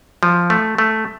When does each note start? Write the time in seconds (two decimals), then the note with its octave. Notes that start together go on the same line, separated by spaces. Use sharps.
0.23 F3
0.50 A3
0.78 A3